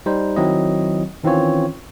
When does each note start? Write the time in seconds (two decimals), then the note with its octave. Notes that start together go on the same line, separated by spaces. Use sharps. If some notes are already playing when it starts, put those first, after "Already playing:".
0.06 G3 D#4 C5
0.36 D#3 F#3 C4 E4 D#5
1.24 D#3 E3 C4 C#4 F4 C#5